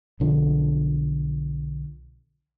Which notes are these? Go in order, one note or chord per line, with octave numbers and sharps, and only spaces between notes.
B1 D3 F3